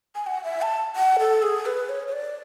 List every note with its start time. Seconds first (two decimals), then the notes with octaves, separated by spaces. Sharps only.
0.15 G#5
0.26 F#5
0.44 E5
0.62 A5
0.96 F#5
1.19 A4
1.42 G#4
1.66 B4
1.89 C#5
2.07 C#5
2.12 D5